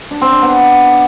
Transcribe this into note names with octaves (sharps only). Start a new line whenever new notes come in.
D4
C4
D4
B3